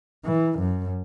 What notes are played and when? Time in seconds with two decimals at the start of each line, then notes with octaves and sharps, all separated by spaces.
0.25 E3
0.60 F#2